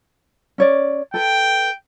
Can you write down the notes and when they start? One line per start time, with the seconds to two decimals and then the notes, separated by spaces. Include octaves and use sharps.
0.58 C#4 C#5 D5
1.14 A4 B4 G5